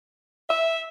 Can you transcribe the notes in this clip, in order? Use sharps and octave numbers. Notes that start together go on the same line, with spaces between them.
E5